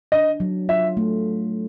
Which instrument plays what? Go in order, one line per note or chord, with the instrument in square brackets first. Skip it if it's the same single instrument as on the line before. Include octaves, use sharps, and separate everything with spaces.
[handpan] D4 [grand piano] D#5
[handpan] F#3
[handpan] F4 [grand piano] E5
[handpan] A3